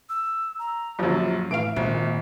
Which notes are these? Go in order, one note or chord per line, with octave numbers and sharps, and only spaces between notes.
E6
A#5
A#1 F#2 F3 G3
A2 E3 E5 F5 D7
G#1 A#2